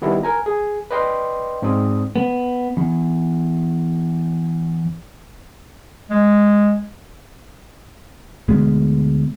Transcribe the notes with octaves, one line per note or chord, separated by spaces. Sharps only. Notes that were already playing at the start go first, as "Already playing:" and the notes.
D#3 G3 B3 E4
A#4 G#5 A#5
G#4
B4 D5 D#5 G5 C6 D6
G#2 C4 D5 D#6
B3
E2
G#3
D2 B2 G#3 B3